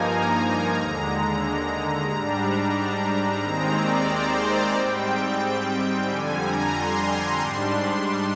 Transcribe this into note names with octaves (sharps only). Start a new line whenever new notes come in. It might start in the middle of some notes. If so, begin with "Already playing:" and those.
Already playing: G2 F3 A#3 D#4 G#5 A#5
A#5
D#2 D3 G#3
G#2 G3 D4
D#2 D#3 G#3 C4 A#5
D5
C5
D5
G#2 G3 C4 G5
F2 D3 G3 G#5
A#5
C6
G#2 G3 D4